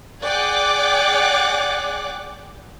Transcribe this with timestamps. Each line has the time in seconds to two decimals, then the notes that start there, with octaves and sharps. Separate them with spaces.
0.23 G#4 D5 F#5 G5 D6 F#6